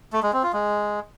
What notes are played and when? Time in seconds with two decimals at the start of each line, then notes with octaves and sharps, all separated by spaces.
0.13 A3
0.23 G#3
0.33 C4
0.43 F4
0.53 G#3